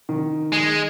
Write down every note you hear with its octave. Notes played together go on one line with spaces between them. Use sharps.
D#3
G#3